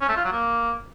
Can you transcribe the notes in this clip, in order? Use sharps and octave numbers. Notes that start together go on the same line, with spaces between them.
C#4
A3
F4
F#3
A#3